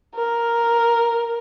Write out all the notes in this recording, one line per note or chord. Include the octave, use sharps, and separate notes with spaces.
A#4